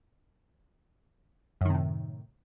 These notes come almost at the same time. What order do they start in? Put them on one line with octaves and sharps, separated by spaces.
F#2 D#3 C3 A2